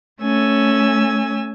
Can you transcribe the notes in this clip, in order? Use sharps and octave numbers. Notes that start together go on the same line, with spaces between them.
A3 C#4 G#5 E6